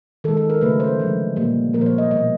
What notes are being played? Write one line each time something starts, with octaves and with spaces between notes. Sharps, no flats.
D#3 G#3 A4
A4
A#4
C#3 F#3 A3 B4
C5
D3 F3 G#3
A#2 G3 A#3
A#2 F3 A#3 A#4
C5
C#5
D#5
B2 G3 A#3 D#5